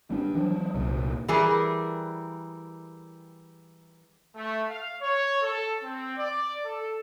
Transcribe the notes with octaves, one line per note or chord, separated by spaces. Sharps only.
G3 C#4 D4
E3 F#3
C2 A#2
E3 G3 G#4 A#4
A3
F5
C#5
A4
C4
D5
A4